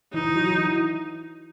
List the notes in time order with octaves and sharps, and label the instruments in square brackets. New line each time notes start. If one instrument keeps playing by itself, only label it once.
[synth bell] E3 E4 [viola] D#4
[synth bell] E3 E4
F#3 F#4
F#3 F#4
E3 E4